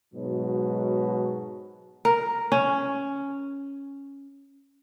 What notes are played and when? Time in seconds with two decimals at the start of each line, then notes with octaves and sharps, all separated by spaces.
0.14 G#2 B2 F#3
2.05 A#4
2.52 C#4